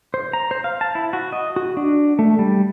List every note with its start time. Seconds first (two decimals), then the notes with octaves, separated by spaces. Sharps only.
0.14 C5
0.33 A#5
0.51 C5
0.64 F5
0.81 A5
0.95 E4
1.13 F#4
1.32 D#5
1.56 F#4
1.77 D4
2.19 A3
2.39 G3